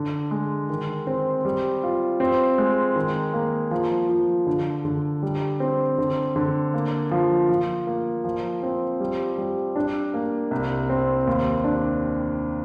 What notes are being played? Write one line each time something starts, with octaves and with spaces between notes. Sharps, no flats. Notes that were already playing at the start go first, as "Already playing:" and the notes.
Already playing: D3
G#3
D#3
C4
G3
F4
C4
G#3
D#3
A#3
F3
F3
D3
D3
G3
C4
D3
D3
A#3
F3
F3
A#3
F3
C4
G3
G3
D4
A#3
C2
C4
D#2
D4